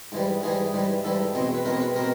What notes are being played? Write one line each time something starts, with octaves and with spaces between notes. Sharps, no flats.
G#2 E3 G3
G#2 E3 G3 G#4
G#2 E3 G3
G#2 E3 G3 A4
E2 B2 G#3 C4
B4
E2 B2 G#3 C4 A#4
B4
B2 G#3 C4 A#4